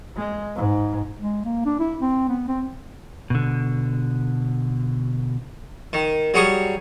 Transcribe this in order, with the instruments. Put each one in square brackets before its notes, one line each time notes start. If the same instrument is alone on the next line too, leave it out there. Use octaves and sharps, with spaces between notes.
[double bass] G#3
G#2
[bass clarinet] G#3
A#3
D4
E4
C4
B3
C4
[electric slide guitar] B2 D3
[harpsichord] D#3
F#3 G3 G#4 C#6 D#6